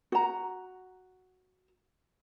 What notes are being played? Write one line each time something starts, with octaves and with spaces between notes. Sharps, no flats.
F#4 A#5